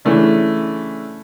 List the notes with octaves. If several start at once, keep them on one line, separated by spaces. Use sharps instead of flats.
C#3 E3 A3 D4